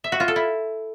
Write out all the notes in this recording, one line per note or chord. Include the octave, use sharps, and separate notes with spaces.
E5
F#4
F4
A4
E4